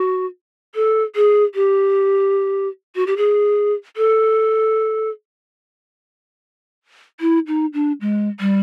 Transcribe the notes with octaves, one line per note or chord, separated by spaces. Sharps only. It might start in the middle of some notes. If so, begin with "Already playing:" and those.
Already playing: F#4
A4
G#4
G4
F#4
G4
G#4
A4
E4
D#4
D4
G#3
G3